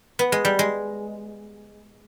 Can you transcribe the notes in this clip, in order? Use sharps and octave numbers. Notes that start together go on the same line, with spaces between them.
B3
G#3
G3
G#3